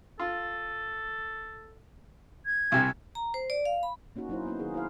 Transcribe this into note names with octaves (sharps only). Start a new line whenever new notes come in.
F4 A4
G#6
C2 C3 G#5
A#5
C5
D5
F5
B5
A#3 C#4 D#4 F#4
F#3 C#4 D#4 E4 C5
A#3 B3 C#4 D#4
D#3 D#4 G#4
E4 C5 F5